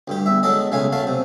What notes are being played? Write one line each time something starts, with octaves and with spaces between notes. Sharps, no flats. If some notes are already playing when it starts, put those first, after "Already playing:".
D2 G2 G4
E2 E5
F#3 G#3 A4 D#5
B1 C#3 A3 F5 G#5
F#3 A3 F5 A5
C3